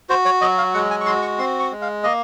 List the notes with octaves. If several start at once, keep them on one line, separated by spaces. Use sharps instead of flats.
F#4 C5
C#5
F#3 D#5
F5
G#3 F#5
G#5
C#6
F#4 C6
C#6
C4 C6
C#6
G#3
F5
A#3 D#5